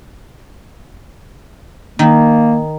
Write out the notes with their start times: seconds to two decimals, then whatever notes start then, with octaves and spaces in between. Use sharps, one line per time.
1.99 D#3 A#3